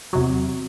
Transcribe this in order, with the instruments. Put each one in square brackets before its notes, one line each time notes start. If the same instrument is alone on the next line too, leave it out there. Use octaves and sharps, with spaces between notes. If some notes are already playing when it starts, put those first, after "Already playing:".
[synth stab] E2 C3 F#3